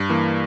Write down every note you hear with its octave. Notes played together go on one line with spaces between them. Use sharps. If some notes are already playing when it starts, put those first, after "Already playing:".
Already playing: G2
E3 A#3